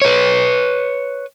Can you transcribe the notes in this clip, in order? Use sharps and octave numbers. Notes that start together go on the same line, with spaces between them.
B4 C#5